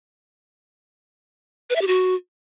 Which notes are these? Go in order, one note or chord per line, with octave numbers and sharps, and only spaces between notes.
B4
E5
G4
F#4